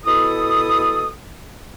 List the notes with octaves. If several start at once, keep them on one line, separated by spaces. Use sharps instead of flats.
B2 E4 A4 D#6